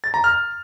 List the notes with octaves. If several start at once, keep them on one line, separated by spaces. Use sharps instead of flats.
A6
A#5
F6